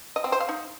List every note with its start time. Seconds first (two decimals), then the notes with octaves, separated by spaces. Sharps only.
0.16 D#5
0.24 C4
0.32 C5
0.40 F5
0.49 D#4